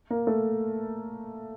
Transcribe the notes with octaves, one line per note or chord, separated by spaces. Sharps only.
A#3 A#4
A3 A4